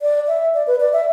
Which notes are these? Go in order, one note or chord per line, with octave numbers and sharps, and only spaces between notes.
D5
E5
D5
B4
D5
E5